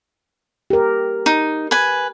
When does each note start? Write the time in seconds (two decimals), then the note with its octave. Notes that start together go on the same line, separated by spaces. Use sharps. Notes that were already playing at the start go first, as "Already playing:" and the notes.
0.70 G4 A#4
1.26 D#4
1.71 B4 G#5